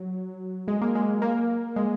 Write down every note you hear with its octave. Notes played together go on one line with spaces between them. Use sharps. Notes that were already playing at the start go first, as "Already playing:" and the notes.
Already playing: F#3
G#3
A#3
G#3
A#3
G#3